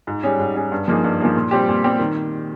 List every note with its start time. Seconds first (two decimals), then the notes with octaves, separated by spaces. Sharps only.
0.07 G#2
0.23 G3 C#4 G#4
0.39 G#2
0.56 G3 C#4 G#4
0.72 G2
0.88 F3 A#3 D#4 G#4
1.04 G2
1.20 F3 A#3 D#4 G#4
1.36 A#2
1.51 G3 C4 G4
1.68 A#2
1.84 G3 C4 G4
1.99 D#3